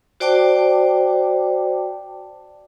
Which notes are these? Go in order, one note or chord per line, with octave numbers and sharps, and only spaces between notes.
F#4 C5 D5 G5 A5 D6